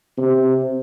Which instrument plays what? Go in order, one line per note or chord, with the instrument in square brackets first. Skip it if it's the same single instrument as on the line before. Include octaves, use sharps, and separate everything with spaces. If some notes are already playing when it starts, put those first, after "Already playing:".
[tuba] C3